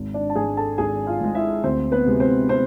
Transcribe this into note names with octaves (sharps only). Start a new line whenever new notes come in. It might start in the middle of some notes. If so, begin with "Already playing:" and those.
Already playing: G#1
D4 D5
A5
G#2 G#3 G#4 G#5
A4 A5
G#1 G#4 G#5
F4 F5
G#2 G#3
E4 E5
D2 C4 C5
B3 B4
C3 G#3
C4 C5
C4 C5